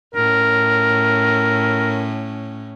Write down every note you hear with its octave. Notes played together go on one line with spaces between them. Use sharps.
A2 C#4 A#4